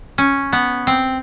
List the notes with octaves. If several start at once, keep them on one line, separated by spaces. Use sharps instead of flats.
C#4
B3
C4